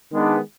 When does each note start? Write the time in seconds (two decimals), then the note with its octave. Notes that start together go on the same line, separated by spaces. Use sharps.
0.11 D#3 G#3 B3 D4